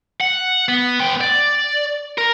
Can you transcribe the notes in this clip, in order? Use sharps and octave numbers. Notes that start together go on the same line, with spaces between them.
F#5
B3
B3 G5
D5
A#4